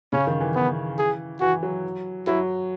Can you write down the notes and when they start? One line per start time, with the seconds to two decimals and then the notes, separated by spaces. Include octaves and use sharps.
0.13 C#3 C#4
0.27 D#3
0.40 E3
0.55 B3
0.98 G#4
1.41 E3 F#4
1.63 F#3
2.27 F#3 E4